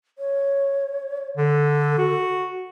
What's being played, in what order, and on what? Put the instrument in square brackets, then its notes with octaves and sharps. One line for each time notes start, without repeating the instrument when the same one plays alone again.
[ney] C#5
[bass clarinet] D3 [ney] A4
[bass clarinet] F#4